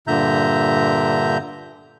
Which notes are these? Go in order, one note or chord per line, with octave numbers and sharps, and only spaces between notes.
G2 A#2 D3 E5 A#5 G6